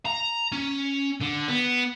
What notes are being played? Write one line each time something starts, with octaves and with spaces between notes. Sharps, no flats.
A#5
C#4
D3
B3